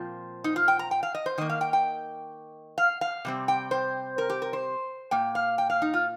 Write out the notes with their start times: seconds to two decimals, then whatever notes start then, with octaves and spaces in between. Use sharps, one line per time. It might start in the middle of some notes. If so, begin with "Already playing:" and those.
Already playing: A#2 F3 C4 F4
0.44 D#4
0.56 F4
0.68 G5
0.79 A#5
0.91 G5
1.03 F5
1.15 D#5
1.26 C5
1.38 D#3 A#3 D#5
1.49 F5
1.61 G5
1.73 G5
2.78 F5
3.01 F5
3.25 C3 G3 C4
3.48 G5
3.71 C5
4.18 A#4
4.30 G4
4.42 A#4
4.53 C5
5.11 A#2 A#3 G5
5.35 F5
5.58 G5
5.70 F5
5.82 D#4
5.94 F4